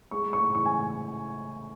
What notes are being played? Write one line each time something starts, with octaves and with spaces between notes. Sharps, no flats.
G#3 C#6
G#3
C#6
A2
E3 C#6
E3 G#5